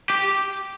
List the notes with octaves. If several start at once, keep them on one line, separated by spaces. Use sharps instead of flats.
G4